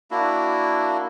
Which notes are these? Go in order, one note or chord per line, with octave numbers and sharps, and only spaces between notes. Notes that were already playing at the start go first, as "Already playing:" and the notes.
A#3 D4 E4 F#4